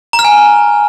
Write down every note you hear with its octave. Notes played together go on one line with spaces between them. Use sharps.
A#5
F6
G#5